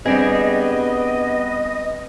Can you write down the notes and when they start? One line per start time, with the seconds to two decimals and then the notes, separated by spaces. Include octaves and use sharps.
0.06 G3 B3 C4 D4 G#4 D#5